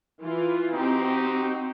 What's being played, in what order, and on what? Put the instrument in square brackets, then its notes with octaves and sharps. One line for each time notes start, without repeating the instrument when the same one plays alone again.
[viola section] E3 F4
[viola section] C4 [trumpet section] D#4 F#4 G4